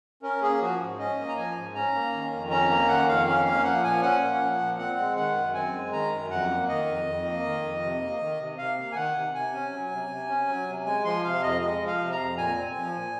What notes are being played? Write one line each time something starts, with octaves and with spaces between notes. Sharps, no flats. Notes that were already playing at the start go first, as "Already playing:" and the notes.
C#4 A#4
A#3 G#4
F3 F#4
G#2
C#4 D#5
A#3
A#5
F3 G#5
G#2
C#4 A#5
A#3
D#3
F2
C#4 A#5
A#3 A#5
D#3 F#5
F2 F5
C#4 F5
A#3 F5
F3 F#5
A#2 G#5
C#4 F#5
A#3
F3
A#2
C4 F#5
G#3
D#3 F#5
F#2
C4 G#5
G#3
D#3 A#5
F#2
F2 F#5
A#3
D#3 D#5
F2
F2
A#3
D#3
F2
C3
A#3
D#3
C3
C3 F5
A#3
G#5
D#3 F#5
C3
C3 G#5
C#4
F#3
C3
C3
C#4
F#3
C3
G#3 G#5
F3 C6
C3 F5
F2 D#5
G#3 D#5
F3
F5
C3
A#5
F2
A#2 G#5
C4
F3
A#2